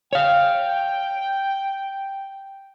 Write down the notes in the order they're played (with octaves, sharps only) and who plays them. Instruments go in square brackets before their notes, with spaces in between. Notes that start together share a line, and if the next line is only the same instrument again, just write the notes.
[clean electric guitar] C#5 F5 [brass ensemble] G5